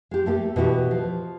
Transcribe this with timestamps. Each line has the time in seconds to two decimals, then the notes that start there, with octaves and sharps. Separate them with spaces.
0.11 G#3 G4
0.26 A3 A#3 G4
0.56 B2 E3 F#4 G4
0.91 F3